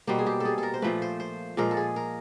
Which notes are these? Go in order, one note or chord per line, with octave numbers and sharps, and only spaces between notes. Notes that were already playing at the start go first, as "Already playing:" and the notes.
B2 G3 A#3 C5
G#4
G4
G#4 A4
A4 A#4
C5
A#2 F3 A3 B4
C5
C5
A#2 F3 G#3 A#4
A4
G#4
A#4